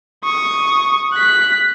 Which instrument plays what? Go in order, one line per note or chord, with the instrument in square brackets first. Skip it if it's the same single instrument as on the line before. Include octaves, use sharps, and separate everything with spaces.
[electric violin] C#6 D#6
F#6 B6